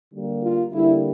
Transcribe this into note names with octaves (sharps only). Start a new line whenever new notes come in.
D3 G3 A#3
F4
D3 G3 A#3 E4